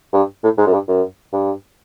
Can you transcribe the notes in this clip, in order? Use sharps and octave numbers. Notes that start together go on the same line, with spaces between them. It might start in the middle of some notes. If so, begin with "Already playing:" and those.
G2
A2
G#2
F#2
G2
F#2
G2